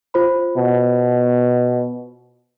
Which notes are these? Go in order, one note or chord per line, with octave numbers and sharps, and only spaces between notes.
F4 C5 B5
B2